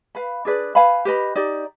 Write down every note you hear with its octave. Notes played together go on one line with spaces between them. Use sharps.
B4 F5 B5
D4 G#4 B4 D5
B4 F5 G#5 B5
G4 B4 D#5 B5
D#4 G4 D5